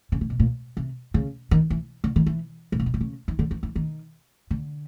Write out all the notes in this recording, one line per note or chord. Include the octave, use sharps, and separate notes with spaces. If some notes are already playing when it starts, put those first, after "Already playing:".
C#3
C3
B2
A#2
C3
C#3
D#3
E3
D3
D#3
E3
A2
A#2
B2
C3
C#3
D#3
D3
E3
E3
D#3
D3